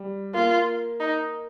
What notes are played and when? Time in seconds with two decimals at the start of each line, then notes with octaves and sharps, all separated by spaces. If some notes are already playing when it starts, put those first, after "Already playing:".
Already playing: G3
0.34 A#3 F4
1.00 D#4